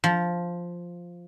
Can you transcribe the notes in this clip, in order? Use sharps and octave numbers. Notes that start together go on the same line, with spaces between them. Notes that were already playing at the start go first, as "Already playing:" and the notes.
F3